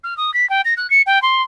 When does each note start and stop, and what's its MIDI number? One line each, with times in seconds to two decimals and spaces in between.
0.04 0.16 89
0.17 0.33 87
0.34 0.48 95
0.49 0.61 79
0.65 0.74 94
0.77 0.89 90
0.90 1.02 97
1.06 1.21 79
1.22 1.42 84